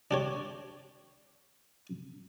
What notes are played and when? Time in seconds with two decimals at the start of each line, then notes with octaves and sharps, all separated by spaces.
0.11 D4 G4 C#5